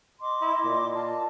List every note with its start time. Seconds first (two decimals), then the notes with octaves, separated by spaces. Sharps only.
0.21 D#5 C6 D6
0.41 E4
0.64 A#2
0.94 F4 D#5 A5